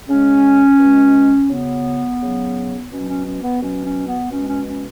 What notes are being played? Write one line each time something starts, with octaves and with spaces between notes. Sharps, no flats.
C#3 G#3 C#4
B2 G#3
C#3 F#3 B3
C#3 F#3
B2 F#3 C#4
C#4
C#4
B3
B2 F#3 C#4
C#4
B3
B2 G#3 C#4
C#4
C#4